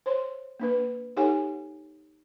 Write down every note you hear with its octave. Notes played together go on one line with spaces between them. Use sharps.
C5 C#5 C6
A#3 D4 B4
D#4 G4 A4 C#5 F#5 G#5